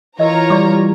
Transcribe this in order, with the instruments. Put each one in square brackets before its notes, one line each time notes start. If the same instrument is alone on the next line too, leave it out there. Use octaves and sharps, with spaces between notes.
[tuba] E3 [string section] F4 C#5 A#5 [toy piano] A#4 D#5
[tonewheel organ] G3 [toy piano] D5 C#6 D6